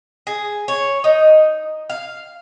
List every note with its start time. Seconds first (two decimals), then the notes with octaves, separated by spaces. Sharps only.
0.27 G#4
0.68 C#5
1.04 D#4
1.90 F5